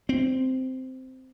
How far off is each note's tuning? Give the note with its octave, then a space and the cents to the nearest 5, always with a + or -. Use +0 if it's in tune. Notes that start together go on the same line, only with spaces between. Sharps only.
C4 -10